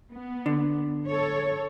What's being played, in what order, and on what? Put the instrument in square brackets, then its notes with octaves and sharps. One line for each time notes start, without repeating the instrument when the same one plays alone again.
[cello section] B3
[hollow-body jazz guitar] D3
[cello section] A4 C#5